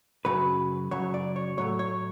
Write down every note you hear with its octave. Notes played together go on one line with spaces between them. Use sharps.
F#2 C#3 F#3 B4
F#2 C#3 F#3 C#5
D5
C#5
A2 F#3 A3 C#5
C#5